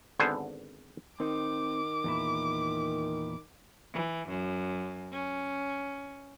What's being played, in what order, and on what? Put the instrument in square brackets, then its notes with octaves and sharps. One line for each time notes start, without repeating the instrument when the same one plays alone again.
[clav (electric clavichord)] G#1 D3 B3 C5 G#5
[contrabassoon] D#3 [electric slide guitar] C4 D#4 [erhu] D6
[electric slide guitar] E2 A#2 E4
[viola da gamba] E3
F#2
C#4